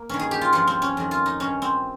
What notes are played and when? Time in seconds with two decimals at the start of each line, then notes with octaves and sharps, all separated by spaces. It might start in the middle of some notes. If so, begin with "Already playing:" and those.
Already playing: A#3
0.09 G2 D#3 C#4
0.19 G#4
0.31 G4
0.41 F4
0.53 G2 F3 F4
0.67 C4
0.82 C#4
0.97 F2 D#3
1.11 F4
1.26 D#4
1.40 G2 D#3 C#4
1.62 C4